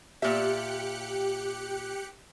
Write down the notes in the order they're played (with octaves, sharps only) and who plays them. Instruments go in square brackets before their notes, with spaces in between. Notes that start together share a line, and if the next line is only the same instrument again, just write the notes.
[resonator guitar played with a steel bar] A#2 E5 [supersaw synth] G4 F#6 C#7